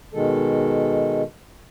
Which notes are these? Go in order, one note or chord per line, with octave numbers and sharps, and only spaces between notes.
B2 D#3 G#3 A4